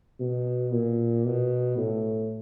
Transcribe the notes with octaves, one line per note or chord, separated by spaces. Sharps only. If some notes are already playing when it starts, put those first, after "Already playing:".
B2
A#2
B2
A2